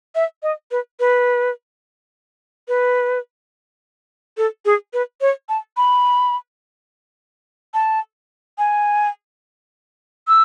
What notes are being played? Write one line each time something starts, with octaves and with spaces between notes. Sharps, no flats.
E5
D#5
B4
B4
B4
A4
G#4
B4
C#5
A5
B5
A5
G#5
E6